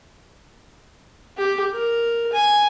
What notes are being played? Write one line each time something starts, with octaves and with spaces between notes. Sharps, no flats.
G4
A#4
G#5